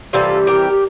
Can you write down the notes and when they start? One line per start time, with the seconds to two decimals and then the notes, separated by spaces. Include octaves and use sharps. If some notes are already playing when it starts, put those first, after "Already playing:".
0.13 C3 E3 G3 F4 A4
0.47 G4 A#4